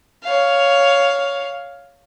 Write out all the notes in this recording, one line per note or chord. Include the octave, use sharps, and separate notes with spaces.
C#5 F5